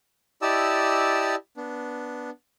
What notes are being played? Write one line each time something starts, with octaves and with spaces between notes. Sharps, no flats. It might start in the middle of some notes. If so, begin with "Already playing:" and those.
E4 G4 D5 D#5 A5 E6
B3 D4